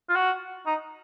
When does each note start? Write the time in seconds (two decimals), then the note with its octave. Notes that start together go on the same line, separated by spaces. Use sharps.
0.09 F4
0.16 F#4
0.66 D#4